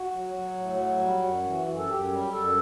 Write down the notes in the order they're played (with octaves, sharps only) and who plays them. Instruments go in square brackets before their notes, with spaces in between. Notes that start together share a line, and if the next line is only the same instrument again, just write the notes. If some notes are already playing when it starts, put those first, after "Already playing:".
Already playing: [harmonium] F#4
F#3
F#3
A2
F#3
G3
F#2
E3
F#2
A4
F#2 G4
G3
F#2 A4